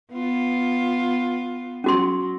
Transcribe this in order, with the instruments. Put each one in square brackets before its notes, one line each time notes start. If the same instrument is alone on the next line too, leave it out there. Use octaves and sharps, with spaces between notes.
[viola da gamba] B3 F4
[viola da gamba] F#3 [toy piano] C#4 F#4 C6